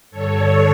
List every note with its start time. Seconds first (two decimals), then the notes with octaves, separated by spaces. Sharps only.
0.10 G2 D3 A4 C#5